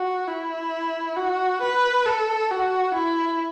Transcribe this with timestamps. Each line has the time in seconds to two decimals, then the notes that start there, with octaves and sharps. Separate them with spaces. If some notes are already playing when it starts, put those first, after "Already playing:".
Already playing: F#4
0.28 E4
1.16 F#4
1.62 B4
2.06 A4
2.51 F#4
2.95 E4